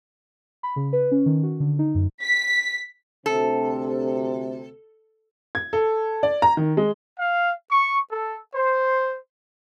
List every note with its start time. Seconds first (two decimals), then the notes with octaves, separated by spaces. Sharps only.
0.63 B5
0.76 C#3
0.93 B4
1.11 C#4
1.26 D#3
1.43 F#4
1.60 D3
1.79 D#4
1.95 F#2
2.23 B6
3.26 D2 C3 A4
5.55 G#6
5.73 A4
6.23 D5
6.42 A#5
6.57 D#3
6.77 G#3
7.18 F5
7.71 C#6
8.11 A4
8.55 C5